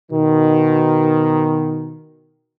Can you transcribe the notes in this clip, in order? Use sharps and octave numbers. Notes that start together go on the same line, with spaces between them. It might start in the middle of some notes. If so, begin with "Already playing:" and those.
B2 D#3